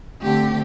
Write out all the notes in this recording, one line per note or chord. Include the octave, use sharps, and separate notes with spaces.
D3 A3 C4 G4